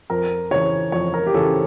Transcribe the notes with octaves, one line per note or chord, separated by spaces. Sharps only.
F2 A#4
C#3 E3 C#5
F2 C#5
A#4
G4
C#3 E3 A4